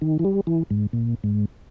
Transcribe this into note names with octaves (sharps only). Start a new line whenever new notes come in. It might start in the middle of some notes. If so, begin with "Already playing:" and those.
D#3
E3
G3
E3
G#2
A#2
G#2